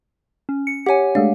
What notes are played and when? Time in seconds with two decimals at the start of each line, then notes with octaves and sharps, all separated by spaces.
0.49 C#4
0.67 C#7
0.86 G4 C#5 F#5 G#5
1.15 G#3 A3 D4 F5